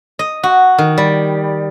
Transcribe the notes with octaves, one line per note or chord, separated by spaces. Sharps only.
D#5
F#4
D#3
G3